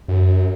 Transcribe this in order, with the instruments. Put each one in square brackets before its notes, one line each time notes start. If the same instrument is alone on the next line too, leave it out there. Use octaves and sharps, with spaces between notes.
[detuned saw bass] F#2